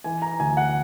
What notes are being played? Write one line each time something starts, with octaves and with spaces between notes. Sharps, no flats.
E3 G#5
A#5
D2 G#5
F#5